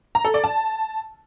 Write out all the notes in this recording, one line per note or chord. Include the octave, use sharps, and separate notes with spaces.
A#5
A4
D5
A5